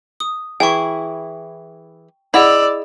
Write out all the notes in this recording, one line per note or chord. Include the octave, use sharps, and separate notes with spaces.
D#6
E3 E4 G#4 G5 C#6
E4 G#4 D5 D#5 F#5 B5 E6